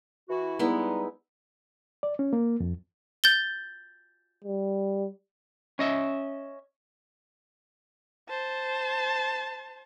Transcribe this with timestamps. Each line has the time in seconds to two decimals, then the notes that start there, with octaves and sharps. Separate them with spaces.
0.29 E3 E4 F#4
0.59 G3 G#3 B3 D#4 E4
2.03 D5
2.19 C#4
2.33 A#3
2.60 F2
3.24 G6 A6 G7
4.44 G3
5.79 C#4 D#5 E5
8.28 C5 A5